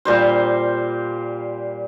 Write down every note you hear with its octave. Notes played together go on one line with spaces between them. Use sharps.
A#2 G3 C5